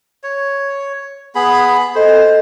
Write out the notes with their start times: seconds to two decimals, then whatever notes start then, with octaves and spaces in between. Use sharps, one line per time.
0.23 C#5
1.35 B3 G#4 B5
1.95 A4 C5 D#5